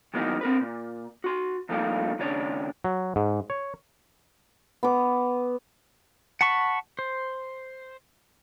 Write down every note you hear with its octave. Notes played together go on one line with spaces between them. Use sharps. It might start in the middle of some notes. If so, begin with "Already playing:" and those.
D#3 E3 F#3 A#3 B3 D#4
C4 A#4 B4
A#2
F#4 C6
G2 F3 A3 A#3 D#4 F5
D#2 C#3 D4 C#5
F#3
G#2
C#5
B3 D6
F#5 A5 B5 C#6
C5